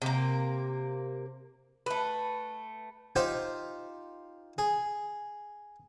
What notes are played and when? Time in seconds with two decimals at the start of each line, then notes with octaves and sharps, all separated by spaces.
0.02 C3 A#3
1.86 A3 B4
3.16 D#4 F4 G4 C5
4.58 G#4